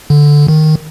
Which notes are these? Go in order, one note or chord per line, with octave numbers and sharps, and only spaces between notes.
D3
D#3